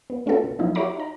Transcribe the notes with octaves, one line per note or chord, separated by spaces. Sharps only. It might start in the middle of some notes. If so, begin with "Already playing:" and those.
B3
A3 C#4 F4 F#4 A4 A#4
B2
F3 F#3 A#3 D#4 E4
F#4 G4 C#5 E5 A#5 D6
D#4 A#5